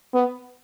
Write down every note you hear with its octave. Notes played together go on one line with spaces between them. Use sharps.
B3